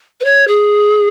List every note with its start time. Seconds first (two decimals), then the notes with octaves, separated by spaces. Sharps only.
0.20 B4
0.24 C#5
0.47 G#4